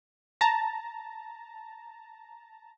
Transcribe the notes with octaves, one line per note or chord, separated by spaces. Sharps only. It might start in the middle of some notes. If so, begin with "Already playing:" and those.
A5 A#5